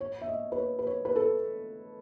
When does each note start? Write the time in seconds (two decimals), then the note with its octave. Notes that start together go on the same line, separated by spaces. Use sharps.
0.01 C#5
0.21 E5
0.28 D#5
0.52 B4
0.58 C#5
0.79 B4
0.87 C#5
1.05 B4
1.16 A4